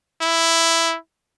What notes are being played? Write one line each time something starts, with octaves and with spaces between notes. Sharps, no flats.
E4